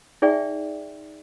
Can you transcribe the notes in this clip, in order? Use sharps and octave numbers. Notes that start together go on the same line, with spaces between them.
D#4 G#4 D5 E5 G5